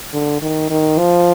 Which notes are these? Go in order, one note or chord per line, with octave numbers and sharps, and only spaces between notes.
D3
D#3
D#3
F3